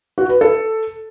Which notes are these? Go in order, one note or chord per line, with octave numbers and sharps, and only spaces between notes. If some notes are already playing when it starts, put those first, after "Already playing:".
F#4
B4
A4